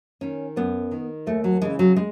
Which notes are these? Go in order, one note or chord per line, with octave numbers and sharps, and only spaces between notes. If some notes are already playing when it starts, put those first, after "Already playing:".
D#3 C#4
F#2 B3
D#3
D#2 A3
F#3
C#3 E3 G#3
F#3
G#3